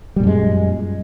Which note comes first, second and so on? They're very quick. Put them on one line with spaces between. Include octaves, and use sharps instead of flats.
G3 A#2 F#2 G#3